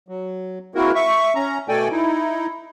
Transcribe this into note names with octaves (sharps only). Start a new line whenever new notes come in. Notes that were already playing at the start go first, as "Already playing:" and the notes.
F#3
G#3 A#3 C4 E4 F#4 A#4
E5 C#6
C#4 A#5
B2 A3 A4 D5 G5 G#5
D#4 E4